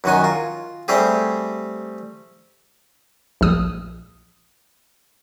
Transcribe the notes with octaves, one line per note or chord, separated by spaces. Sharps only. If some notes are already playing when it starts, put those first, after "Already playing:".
F#2 D#3 F#4 G#5
F4
G3 A3 C4 G4 G#4
A#1 D#6